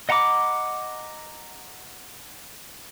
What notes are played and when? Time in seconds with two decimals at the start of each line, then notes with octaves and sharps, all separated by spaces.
0.09 D#5 F#5 A#5 B5 D6